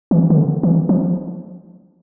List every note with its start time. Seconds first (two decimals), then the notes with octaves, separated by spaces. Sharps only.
0.11 E3
0.30 D#3
0.37 D3
0.63 E3
0.89 F3